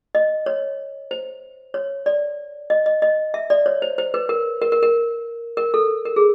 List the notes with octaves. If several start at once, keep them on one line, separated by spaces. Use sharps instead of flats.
D#5
C#5
C5
C#5
D5
D#5
D#5
D#5
E5
D5
C#5
C5
C5
B4
A#4
A#4
A#4
A#4
A#4
A4
A#4
G#4